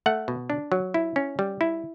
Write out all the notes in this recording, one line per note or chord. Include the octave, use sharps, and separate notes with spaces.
A3 F#5
B2
D4
F#3
E4
C#4
G3
E4